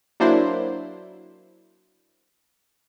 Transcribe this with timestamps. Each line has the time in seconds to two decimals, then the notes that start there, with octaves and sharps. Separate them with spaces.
0.20 F#3 A#3 D4 E4 C5